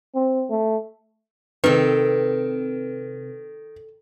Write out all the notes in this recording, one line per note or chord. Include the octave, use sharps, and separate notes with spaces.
C4
A3
C3 D#3 C4 A4 B4 G5